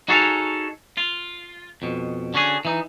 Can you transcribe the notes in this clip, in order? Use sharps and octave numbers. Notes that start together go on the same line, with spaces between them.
D#4 F#4 G#4 A4 C#5 F5
F4
F2 B2
D3 C#4 F#4 G#4
E3 D#4